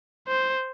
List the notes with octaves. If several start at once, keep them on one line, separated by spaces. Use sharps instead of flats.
C5